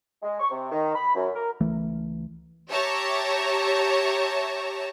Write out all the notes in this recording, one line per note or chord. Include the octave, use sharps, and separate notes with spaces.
G#3
C#6
C3
D#3
B5
F#2
A#4
C#2 E3 A3
G4 C#5 E5 A5 A#5